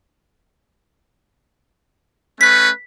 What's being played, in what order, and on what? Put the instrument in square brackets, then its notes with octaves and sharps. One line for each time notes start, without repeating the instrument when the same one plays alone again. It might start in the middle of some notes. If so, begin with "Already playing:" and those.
[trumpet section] A3 C#4 B4 [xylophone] B6